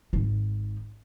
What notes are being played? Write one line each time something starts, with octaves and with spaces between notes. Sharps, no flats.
G#1 D#4